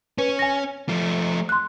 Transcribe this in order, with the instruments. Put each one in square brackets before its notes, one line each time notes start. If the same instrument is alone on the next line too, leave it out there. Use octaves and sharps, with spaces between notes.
[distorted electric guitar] C#4 [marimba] B4
[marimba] G#5 A#6
[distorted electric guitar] F3 A3
[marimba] C6 F#6